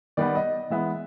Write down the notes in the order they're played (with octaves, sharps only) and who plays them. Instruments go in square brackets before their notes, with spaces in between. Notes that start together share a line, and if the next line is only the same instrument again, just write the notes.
[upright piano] D#3 G3 B3 D5
D#5
E3 G#3 B3 E5